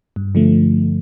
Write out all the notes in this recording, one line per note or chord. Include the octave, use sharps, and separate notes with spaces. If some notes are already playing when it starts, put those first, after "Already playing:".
G2
D3 F3 A3